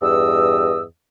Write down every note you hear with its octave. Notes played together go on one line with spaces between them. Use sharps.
E2 G2 D#5 E6